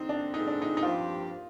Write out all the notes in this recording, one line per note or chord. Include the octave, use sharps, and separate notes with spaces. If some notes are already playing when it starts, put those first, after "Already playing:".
Already playing: D3 G3 C4 D#4
D4
D3 G#3 C4 D#4
D4
D#4
D#4
G2 F3 C4 F4 G4